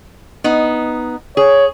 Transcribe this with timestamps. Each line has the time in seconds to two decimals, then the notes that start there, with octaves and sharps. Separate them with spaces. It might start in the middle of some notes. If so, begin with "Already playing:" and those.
0.44 B3 D#4
1.37 G#4 C#5